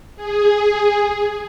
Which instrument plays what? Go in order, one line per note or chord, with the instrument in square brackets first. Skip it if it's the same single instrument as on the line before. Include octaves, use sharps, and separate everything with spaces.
[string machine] G#4